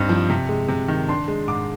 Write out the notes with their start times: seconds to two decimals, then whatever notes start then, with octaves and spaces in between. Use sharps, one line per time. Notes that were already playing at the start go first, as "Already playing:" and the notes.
Already playing: G2 C4 D#4
0.09 F3
0.30 C3
0.49 G#3
0.68 C3
0.88 D#3
1.08 D4 C6
1.28 G#3
1.48 G#2 D6